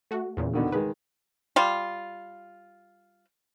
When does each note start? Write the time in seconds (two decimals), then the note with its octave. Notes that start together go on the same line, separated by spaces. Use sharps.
0.11 A3 F#4
0.37 E2 A#2 C#3
0.53 B2 D3 D#3
0.72 D#3 G#3 B4
1.56 G3 F4